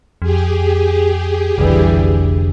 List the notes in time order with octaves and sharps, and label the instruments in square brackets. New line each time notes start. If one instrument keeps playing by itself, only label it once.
[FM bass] F2 [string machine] G4 G#4
[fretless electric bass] F1 D3 [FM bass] B1 [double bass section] E3 G3